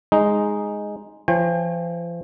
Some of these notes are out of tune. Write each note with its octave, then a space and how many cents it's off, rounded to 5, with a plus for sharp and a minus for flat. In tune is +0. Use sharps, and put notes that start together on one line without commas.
G#3 +0 D#4 +0
F3 -40 C#5 -40 G5 +35